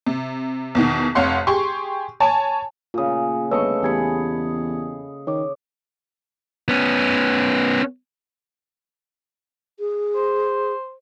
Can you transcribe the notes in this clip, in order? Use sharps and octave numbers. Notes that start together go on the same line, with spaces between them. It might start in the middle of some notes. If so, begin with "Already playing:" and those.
C3
E2 B2 D#3
F1 F2 C#5 F5 F#5 C6
G4 G#4 C6 C#6
C#5 G#5 A5
A#2 C#3 F4 D#6
G1 A3 B4 C#5 D#5 C#6 E6
E2 G4 G#4 B5 G#6 C#7
D#3 C#5 D6
B3 C#4
G#4
C5